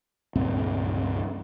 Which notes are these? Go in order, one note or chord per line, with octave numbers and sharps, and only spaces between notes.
C#2 G2 A#2 C4